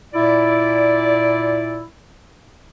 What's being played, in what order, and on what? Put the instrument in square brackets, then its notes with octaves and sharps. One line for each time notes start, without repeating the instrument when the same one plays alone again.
[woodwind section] A#2 E4 D5